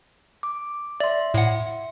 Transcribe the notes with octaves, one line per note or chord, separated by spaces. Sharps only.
D6
D5 E5 C6
A2 F#5